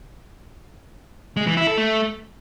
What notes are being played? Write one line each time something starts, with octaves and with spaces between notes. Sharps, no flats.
G#3
E3
E4
A4
A3